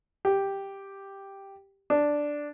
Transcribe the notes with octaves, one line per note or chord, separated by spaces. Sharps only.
G4
D4